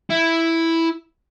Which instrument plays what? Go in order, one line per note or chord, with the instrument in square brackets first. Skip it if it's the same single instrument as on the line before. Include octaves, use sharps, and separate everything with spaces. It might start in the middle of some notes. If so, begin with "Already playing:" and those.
[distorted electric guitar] E4